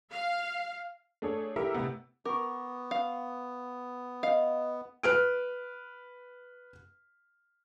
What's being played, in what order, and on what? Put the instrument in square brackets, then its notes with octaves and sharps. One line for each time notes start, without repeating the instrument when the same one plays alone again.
[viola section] F5
[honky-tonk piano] A3 D4 G#4 A4 C#5
E4 G4 A4 A#4 E5 E6
A2 C3 B3
[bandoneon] B3 [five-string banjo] A#4 [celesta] C#6 D6
[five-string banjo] F5
[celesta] D#5 [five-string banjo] F5
[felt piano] B4 F6 D7